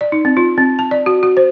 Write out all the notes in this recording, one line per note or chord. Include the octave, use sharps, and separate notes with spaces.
D5
D#4
C4
F4
C4
A5
D5
F#4
F#4
C5